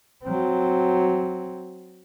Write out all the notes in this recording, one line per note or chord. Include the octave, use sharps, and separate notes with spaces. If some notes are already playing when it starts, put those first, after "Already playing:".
F#3 C4